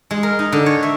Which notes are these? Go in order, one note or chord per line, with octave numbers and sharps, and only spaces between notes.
G#3
A#4
D#4
D3
C#5
E5